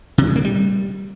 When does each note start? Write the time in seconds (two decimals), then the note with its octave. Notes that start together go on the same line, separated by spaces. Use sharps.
0.18 C3
0.27 C#3
0.36 A#3
0.44 G3